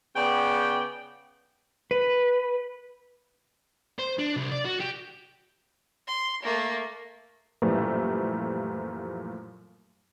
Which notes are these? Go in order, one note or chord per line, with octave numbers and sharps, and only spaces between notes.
C#3 B3 D5 G5
B4
C5
D4
C2
D5
F#4
G4
C6
A3 A#3
F#2 A#2 E3 F3 G3 A3